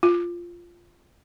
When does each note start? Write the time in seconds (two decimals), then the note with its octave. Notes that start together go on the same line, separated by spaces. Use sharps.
0.03 F4